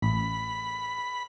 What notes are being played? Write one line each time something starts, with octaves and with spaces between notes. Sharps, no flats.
A1 B5